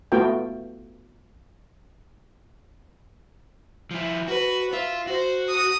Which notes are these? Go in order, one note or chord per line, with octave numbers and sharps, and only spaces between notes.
A3 B3 F4 F#4 G5
F3 E4
F#4 B4
F4 E5
F#4 C5
D#6